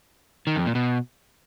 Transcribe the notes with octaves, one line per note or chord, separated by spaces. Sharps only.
D#3
F2
A#2
B2